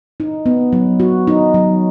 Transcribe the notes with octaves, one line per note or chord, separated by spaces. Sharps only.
D#4
B3
F#3
F#4
D#4
F#3